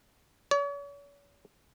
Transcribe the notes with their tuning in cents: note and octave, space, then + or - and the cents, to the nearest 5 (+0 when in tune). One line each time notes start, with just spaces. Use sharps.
C#5 +45